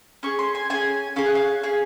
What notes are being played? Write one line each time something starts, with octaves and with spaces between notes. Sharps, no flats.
C#4 G#4 C#6
C6
G#5
C#4 G#4 G#5
C#4 G#4 F5
F#5
F5
C#4 G#4